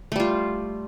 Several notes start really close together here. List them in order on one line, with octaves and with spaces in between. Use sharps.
A3 G3 F4